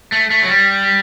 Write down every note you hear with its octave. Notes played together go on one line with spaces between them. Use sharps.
A3
A3
F#3
G3